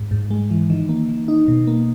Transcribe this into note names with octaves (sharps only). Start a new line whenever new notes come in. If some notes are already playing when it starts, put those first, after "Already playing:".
Already playing: G#2
G#2
G#3
E3
D#3
A#3
D#3
D#4
B2
A#3